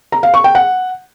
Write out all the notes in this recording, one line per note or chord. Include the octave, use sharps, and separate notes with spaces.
A#5
F5
C#6
G5
F#5